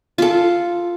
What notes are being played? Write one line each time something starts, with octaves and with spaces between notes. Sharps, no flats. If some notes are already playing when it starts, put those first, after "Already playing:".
F4 A4